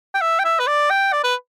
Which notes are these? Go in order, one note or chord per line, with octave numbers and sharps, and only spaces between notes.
G5
E5
G5
E5
B4
D5
G5
D5
B4